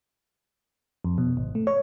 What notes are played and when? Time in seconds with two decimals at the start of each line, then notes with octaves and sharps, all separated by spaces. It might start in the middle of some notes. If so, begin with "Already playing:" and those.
1.05 F2
1.18 B2
1.37 G#1
1.55 A3
1.67 C#5